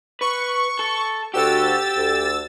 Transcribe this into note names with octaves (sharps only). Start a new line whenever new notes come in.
B4 C#6
A4
D2 D3 F#4 G4 E6 A6
D2